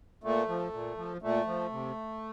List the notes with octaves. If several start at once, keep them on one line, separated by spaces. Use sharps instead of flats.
A#2 A3
F3
A#2
F3
A#2 A3
F3
C3